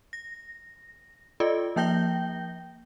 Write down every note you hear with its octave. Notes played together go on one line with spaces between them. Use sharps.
A#6
F4 A4 D5 D#5
F3 A#3 G5 G6 A#6 G7